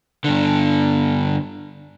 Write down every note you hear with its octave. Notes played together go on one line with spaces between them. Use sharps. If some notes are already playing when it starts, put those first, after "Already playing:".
G2 D3